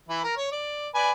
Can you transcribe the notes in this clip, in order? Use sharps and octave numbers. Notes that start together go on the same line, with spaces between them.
E3 E4
A#4
C#5
D5
B4 D5 G#5